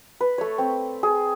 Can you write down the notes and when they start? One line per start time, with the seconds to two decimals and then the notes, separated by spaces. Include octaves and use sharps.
0.21 B4
0.38 A3 C#5
0.58 C4
1.03 G#4